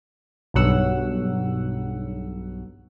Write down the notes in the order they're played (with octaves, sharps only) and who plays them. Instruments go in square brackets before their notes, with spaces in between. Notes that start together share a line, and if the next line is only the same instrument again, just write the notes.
[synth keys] B1 G2 F#3 F#5 E6